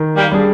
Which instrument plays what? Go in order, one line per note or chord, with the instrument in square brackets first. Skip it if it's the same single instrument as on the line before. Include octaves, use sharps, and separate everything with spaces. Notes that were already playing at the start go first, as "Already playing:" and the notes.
Already playing: [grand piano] D#3
[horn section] G3 A#3
[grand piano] G3 D4 G#4